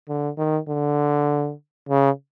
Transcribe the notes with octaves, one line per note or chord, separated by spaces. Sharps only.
D3
D#3
D3
C#3